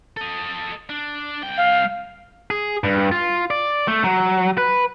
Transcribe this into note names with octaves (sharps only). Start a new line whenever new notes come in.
A4 D#5
D4
C2 G5
F5
G#4
G2
F4
D5
A3
F#3
B4